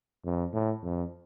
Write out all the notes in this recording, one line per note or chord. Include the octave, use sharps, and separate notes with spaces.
F2
A2
F2